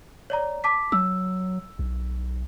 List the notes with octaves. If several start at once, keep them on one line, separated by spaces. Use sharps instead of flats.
C#5 D5 A#5
A5 D6 B6
F#3 E6
B1